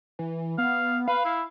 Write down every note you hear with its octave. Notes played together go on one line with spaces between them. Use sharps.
E3
B3 F5
B4 F5
E4